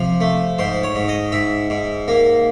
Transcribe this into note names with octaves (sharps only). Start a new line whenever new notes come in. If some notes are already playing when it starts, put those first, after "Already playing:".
Already playing: C3 F3
A3
G#2 C5
C#5
G#2
D#5
G#2 E5
G#2
A#3